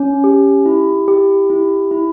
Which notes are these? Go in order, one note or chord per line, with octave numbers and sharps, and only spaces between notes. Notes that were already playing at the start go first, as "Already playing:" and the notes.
Already playing: C#4
G4
E4
G4
E4
E4